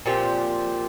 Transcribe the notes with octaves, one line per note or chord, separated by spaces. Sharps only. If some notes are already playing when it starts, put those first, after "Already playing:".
A#2 F3 C4 G4